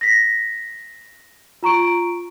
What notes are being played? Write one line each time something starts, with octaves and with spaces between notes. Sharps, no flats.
A#6 B6
F4 A#5 C#6 D7